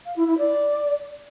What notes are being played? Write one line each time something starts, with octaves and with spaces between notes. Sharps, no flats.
F5
E4
E4
D5